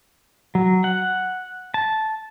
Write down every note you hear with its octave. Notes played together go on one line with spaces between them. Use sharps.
F#3
F#5
A5